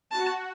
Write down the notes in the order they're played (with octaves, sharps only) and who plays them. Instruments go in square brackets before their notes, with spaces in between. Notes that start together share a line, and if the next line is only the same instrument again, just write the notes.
[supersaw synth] F#4 [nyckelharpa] A5